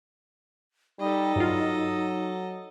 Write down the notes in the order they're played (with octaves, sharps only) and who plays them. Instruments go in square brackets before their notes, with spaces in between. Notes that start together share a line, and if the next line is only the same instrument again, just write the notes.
[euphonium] G3 [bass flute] D#4 [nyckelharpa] A4 D#5
[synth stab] G2 F4 [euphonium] F#3